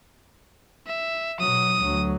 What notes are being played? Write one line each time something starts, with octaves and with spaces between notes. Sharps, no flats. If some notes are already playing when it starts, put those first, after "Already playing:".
E5
B2 F#3 D#6
D2 F#3